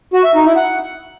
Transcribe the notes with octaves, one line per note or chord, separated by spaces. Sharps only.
F#4
E5
D#4
E4
F#5